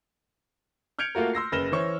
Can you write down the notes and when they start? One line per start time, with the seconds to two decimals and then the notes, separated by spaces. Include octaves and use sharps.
0.99 F6 G6 G#6 C#7 D7 F7
1.15 A3 A#3 F4 F#4 A#4
1.33 C6 E6 A#6 C7
1.52 F#1 B4 F6 A#6 E7 G7
1.72 E3 C5 C#5 C#6